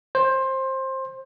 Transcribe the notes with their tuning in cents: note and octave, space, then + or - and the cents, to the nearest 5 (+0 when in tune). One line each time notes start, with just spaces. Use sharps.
C5 +20